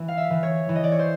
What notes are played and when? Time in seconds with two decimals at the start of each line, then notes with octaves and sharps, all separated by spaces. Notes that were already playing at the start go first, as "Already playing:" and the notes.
Already playing: E3
0.08 F5
0.17 E5
0.30 E3
0.43 C#5
0.69 E3
0.75 D#5
0.84 D5
0.92 C#5
0.99 C5